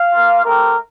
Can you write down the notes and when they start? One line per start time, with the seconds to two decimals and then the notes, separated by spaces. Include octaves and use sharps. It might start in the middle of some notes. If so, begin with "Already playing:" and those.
Already playing: F5
0.12 A#3 F4
0.44 A3 C4 G4 A#4